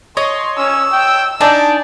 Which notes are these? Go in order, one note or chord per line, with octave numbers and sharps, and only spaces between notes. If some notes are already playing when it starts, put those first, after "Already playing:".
C#5 D#5 C6
C#4 E6
G5
D4 D#4 D5 G#5 A5